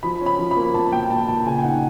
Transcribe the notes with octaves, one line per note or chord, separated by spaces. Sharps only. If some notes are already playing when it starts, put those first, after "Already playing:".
F3 B5
C#4
B5
F3
B5
A#3
A#2 A5
A#2 G5
A#2 A5
A#2 A5
C#3 G#5
G5
D#4 F#5